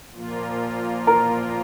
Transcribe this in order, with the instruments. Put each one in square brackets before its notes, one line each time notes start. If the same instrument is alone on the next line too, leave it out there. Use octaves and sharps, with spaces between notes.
[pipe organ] A#2 F3 A#3 F4
[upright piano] A#4 A#5